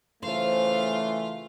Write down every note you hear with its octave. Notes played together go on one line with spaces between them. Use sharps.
C#3 E3 A3 F4 C5 F5